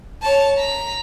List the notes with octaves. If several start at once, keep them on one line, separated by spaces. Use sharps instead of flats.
C#5 A5
A#5 B6